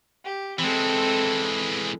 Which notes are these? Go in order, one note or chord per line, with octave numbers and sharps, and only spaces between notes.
G4
E3 G#3 C4 A4